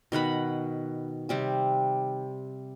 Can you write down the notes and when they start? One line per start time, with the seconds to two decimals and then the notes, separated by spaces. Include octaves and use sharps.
0.12 B2 D#3 F#5 B5
1.29 C3 G3 C4